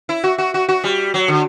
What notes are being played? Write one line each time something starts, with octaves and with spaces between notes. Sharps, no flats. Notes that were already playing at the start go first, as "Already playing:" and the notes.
E4
F#4
F#4
F#4
F#4
G3
F#3
D3